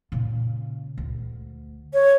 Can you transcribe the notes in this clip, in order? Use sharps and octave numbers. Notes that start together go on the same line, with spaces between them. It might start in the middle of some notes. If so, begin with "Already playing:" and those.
A#2 C#3
D2
C#5